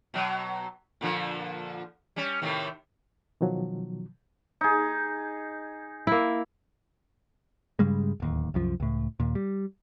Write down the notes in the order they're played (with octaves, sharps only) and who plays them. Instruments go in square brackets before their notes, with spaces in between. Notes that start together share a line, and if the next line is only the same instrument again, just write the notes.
[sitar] B2 F#3
A#2 D3 F3
G3 C#4
A2 C3 D#3
[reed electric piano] B2 D#3 F3 F#3
[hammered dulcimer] D#4 G#4
[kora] A#3 E4
[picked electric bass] G2 C#3 G3 G#3
D1 D#2
C2 F#2 F3
C#2 A2
D#2 A#2
G3